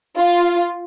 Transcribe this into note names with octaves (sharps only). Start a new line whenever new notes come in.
F4